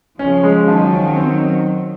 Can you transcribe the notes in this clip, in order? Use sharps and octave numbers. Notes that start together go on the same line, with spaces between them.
C#3 F3 C#4
G#3
D#3 F3 F#3
C#4
C4